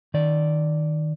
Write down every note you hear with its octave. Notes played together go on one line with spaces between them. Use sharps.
D#3 D5